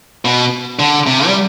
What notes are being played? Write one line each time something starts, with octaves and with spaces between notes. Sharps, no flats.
B2
D3
C3
G3